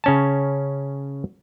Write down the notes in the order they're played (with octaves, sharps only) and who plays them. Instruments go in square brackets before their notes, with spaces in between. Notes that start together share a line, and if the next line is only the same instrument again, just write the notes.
[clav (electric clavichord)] C#3 C#4 A5